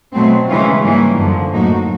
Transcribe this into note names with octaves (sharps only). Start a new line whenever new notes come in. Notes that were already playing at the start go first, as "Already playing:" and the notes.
B2 F#3 A3 C4
C#3 E3 G#3 C#4 F4
G#2 E3 G3 A#3 C#4
F#2 D3 F3
A2 F#3 A#3 D#4 F#4